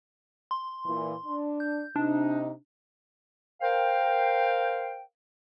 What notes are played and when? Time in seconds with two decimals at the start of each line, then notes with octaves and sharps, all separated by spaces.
0.51 C6
0.86 A#2 E3
1.26 D4
1.60 G6
1.96 C3 D4 D#4
3.61 A#4 C5 F5 G5